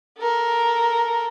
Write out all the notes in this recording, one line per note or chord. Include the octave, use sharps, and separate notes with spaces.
A4 A#4